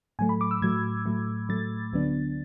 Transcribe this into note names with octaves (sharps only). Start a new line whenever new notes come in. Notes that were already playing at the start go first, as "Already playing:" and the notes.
A2 F#3 A3 G#5
B5
D6
E6
A2 F#3 A3 G#6
A2 F#3 A3
A2 F#3 A3 A6
D2 D3 F#3 B3 D4